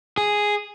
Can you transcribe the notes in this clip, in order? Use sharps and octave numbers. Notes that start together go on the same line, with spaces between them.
G#4